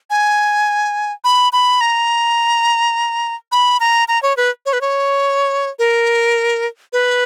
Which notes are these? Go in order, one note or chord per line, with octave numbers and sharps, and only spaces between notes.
G#5
B5
B5
A#5
B5
A#5
A#5
C#5
B4
C#5
B4
C#5
A#4
B4